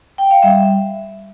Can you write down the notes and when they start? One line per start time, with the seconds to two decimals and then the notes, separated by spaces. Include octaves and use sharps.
0.18 G5
0.31 F5
0.43 G3 E5